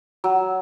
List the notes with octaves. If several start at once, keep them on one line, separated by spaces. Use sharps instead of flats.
F#3